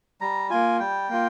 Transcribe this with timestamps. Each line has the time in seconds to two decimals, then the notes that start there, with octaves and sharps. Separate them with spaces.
0.21 G3 A#5
0.50 A#3 F4 G#5
0.80 G3 G5
1.09 A#3 F4